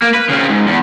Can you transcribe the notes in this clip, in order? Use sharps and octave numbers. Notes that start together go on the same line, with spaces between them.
A#3
B4
C#3 C4
G#2
E2